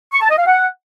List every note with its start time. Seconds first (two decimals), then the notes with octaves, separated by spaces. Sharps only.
0.13 C#6
0.21 A5
0.30 D#5
0.38 F5
0.47 F#5